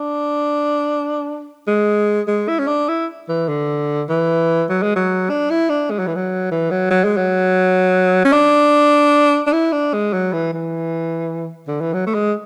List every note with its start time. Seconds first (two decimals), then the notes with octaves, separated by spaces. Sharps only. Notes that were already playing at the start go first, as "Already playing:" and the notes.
Already playing: D4
1.67 G#3
2.28 G#3
2.48 E4
2.59 C#4
2.67 D4
2.89 E4
3.29 E3
3.49 D3
4.10 E3
4.70 F#3
4.83 G#3
4.96 F#3
5.30 D4
5.50 E4
5.70 D4
5.91 G#3
5.99 F#3
6.07 E3
6.15 F#3
6.51 E3
6.71 F#3
6.91 F#3
7.04 G#3
7.17 F#3
8.25 C#4
8.33 D4
9.47 D4
9.53 E4
9.72 D4
9.94 G#3
10.13 F#3
10.33 E3
10.54 E3
11.67 D3
11.81 E3
11.94 F#3
12.07 A3
12.14 G#3